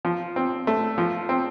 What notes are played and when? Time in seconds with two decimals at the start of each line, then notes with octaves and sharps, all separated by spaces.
0.05 F3
0.36 C4
0.67 A3
0.98 F3
1.29 C4